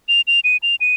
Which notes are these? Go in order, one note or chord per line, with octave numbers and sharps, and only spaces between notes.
F7
F7
D#7
F7
D#7